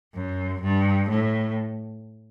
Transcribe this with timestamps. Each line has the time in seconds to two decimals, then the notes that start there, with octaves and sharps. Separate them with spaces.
0.14 F#2
0.62 G2
1.10 A2